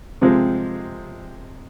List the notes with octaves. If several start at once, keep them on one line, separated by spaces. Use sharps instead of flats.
C3 F3 G#3 C4